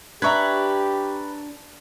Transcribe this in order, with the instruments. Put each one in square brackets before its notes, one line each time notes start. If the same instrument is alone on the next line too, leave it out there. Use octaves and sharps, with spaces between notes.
[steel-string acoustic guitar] D4 [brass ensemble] G4 [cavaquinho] B4 E5 [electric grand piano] A#5 C#6 G#6